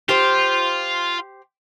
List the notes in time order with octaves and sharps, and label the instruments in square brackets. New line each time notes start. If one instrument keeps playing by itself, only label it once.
[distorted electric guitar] F4 [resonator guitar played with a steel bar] G4 C5